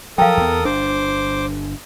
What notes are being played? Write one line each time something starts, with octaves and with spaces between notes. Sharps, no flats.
F3 F#3 A4 A#4 F5 G5 D#6
E2 B3
G1 D4 C5 D6